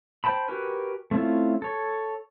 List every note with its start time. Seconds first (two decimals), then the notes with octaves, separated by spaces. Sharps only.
0.24 C5 G5 A5 B5
0.48 F#4 G4 A#4 B4 G#5
1.11 A3 C4 C#4 E4 F4
1.62 A4 C#5